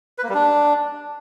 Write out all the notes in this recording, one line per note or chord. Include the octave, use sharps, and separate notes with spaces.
B4
A#3
G3
D4